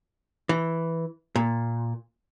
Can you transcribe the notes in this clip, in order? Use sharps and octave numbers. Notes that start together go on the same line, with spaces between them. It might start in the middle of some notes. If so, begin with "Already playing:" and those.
E3
A#2